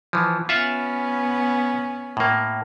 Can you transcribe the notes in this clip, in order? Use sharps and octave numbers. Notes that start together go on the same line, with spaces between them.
E3 F3
B3 C#4 F4 E5 F#5
A2 A#3